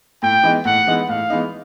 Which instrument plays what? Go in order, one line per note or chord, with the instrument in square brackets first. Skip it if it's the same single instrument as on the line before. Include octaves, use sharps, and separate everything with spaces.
[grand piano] A2 [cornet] G5
[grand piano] E3 G#3 B3 D#4
[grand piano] A2 [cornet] F#5
[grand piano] E3 G#3 B3 D#4
[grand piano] A2 [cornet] F5
[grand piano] E3 G#3 B3 D#4